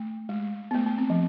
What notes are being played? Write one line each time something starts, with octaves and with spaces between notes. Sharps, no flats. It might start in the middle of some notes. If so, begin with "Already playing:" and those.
Already playing: A3
G#3
B3
A3
B3
C4
F3